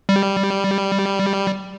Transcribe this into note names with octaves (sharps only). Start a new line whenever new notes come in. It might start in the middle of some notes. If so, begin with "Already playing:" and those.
G3